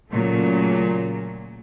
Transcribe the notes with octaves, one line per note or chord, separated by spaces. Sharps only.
A#2 C#3 F#3 A3